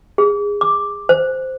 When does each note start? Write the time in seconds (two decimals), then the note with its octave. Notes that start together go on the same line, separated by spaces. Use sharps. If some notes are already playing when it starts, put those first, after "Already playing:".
0.18 G#4
0.61 D6
1.09 C5